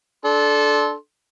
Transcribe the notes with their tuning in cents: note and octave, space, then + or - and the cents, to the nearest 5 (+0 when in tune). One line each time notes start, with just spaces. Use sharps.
D4 +0 A4 -20 C6 +0